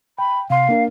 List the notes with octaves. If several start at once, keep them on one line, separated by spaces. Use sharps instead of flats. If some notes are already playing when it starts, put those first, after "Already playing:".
G5 B5
C3 F5 C6
A#3 D4 A#4